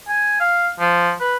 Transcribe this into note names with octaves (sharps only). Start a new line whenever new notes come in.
G#5
F5
F3
B4